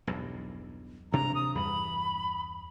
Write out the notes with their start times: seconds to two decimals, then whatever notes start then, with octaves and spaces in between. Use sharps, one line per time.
0.07 B1 E2 G2
1.12 D2 C3 D4 A#5
1.35 D#6
1.55 E2 G2 B5